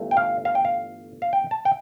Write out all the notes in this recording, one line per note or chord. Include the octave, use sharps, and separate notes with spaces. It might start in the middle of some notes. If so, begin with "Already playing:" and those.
Already playing: G1 G2 E3 A3
G5
F5
F5
G5
F5
F5
G5
A5
G5